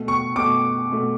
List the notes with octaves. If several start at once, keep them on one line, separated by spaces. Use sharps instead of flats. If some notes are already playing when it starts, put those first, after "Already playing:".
Already playing: B2 A3
C#6
B2 A3 D6
B2 A3